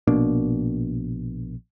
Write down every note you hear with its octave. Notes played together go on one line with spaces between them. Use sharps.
A#1 B2 A#3 D4